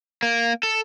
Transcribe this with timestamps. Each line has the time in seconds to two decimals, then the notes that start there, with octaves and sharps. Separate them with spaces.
0.23 A#3
0.63 A4